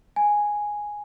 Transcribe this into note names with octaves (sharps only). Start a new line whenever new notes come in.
G#5